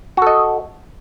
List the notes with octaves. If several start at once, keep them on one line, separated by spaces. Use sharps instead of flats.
F#4 A4 D#5